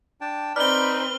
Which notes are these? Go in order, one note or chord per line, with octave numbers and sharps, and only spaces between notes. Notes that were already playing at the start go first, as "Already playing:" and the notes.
D4 G5 A5
C4 D#4 B4 D5 B5 F6 G7